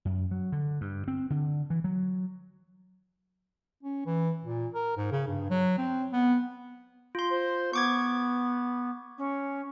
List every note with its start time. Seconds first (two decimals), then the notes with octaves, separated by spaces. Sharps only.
0.05 F#2
0.31 F#3
0.52 D3
0.81 G2
1.08 C4
1.30 D3
1.70 E3
1.84 F#3
3.83 C#4
4.06 E3
4.44 A#2
4.73 A#4
4.97 G#2
5.12 C#3
5.28 G2
5.50 F#3
5.78 C4
6.12 B3
7.15 F4 C6
7.30 C5
7.73 B3 C#6 D6 G#6
9.18 C#4